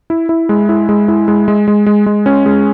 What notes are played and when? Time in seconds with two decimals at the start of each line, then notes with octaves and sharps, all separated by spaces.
0.10 E4
0.29 E4
0.49 G#3
0.69 E4
0.89 G#3
1.08 E4
1.28 G#3
1.48 G#3
1.68 G#3
1.86 G#3
2.06 G#3
2.26 C#4
2.46 G#3